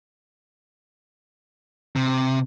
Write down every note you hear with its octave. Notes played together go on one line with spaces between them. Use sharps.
C3